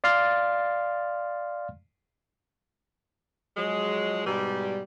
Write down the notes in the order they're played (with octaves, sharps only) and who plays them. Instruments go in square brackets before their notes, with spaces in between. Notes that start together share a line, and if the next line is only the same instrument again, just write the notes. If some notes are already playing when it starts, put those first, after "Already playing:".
[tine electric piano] D5 F5 C6 F6 A6
[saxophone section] F3 F#3 G#3
G#2 B2 G3